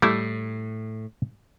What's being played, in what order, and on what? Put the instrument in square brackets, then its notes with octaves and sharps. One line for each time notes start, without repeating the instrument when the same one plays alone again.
[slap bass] A2 [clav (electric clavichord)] G3 A3 E4